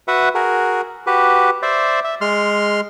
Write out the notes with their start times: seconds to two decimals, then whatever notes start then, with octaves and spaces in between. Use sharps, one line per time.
0.08 F#4 B4 E5 F#5
0.35 F#4 G#4 A#4
1.07 F#4 G4 B4
1.62 C5 D5 E5
2.04 E5
2.21 G#3 C6 F6